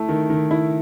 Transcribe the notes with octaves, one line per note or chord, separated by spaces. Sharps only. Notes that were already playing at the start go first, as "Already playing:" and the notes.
Already playing: A3 E4
D#3
D#3
E4